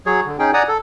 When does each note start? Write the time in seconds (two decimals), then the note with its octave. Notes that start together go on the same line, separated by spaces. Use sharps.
0.06 F#3 G#4 C#5
0.26 D3
0.39 C#4 D#4 G#4 G5
0.54 D5 F#5 G#5 A#5 D#6
0.68 A4